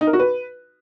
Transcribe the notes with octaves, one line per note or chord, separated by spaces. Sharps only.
D#4
A#4
F#4
B4